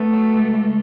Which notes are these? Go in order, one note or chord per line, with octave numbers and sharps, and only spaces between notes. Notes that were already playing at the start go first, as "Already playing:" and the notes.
Already playing: A3 B3
F#3
C#2
C#2